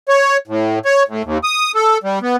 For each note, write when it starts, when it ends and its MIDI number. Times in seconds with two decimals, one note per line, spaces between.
0.09 0.37 73
0.48 0.79 45
0.85 1.03 73
1.08 1.22 45
1.24 1.38 39
1.44 1.72 87
1.75 1.98 69
2.03 2.19 55
2.22 2.36 59